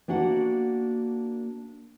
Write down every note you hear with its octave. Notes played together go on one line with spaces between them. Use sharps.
A#3 D4 F#4 F#5